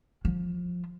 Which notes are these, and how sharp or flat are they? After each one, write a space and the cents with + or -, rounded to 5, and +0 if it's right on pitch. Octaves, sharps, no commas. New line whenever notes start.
F3 +20